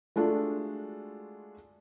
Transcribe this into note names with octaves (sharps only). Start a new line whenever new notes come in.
G#3 A3 D4 F4 F#4 A4